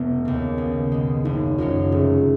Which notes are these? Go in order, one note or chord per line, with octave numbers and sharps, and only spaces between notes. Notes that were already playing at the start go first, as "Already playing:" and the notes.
Already playing: F1 B3
D#2 C#3
B1
B2 G#3
F#1 D#4
F#2 F3 G#3 C#4 F4
F1 G#4